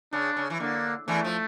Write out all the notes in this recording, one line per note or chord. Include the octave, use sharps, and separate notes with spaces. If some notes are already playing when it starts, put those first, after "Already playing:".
C#3 D4
C#3
E3
D3 A#3
E2 E3 A3
F3